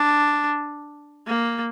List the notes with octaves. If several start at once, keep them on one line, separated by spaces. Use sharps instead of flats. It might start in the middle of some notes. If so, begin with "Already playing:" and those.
Already playing: D4
A#3